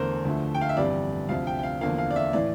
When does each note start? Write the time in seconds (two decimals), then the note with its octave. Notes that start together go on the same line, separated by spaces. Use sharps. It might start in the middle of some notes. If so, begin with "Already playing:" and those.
Already playing: E2 D3 A3 A#4 C5
0.25 D2 D3 F3 A3
0.55 G5
0.61 F5
0.69 E5
0.77 G1 F2 E3 G3 D5
1.29 D2 C3 F3 F5
1.47 G5
1.59 G5
1.63 F5
1.81 E2 D3 F3 A#3 F5
1.98 F5
2.11 D5
2.16 E5
2.33 A2 E3 D5